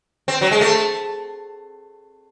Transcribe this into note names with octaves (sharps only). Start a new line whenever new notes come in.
C4
F#3
G#3
A3